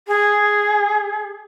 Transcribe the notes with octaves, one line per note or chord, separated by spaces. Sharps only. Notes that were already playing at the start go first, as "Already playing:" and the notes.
G#4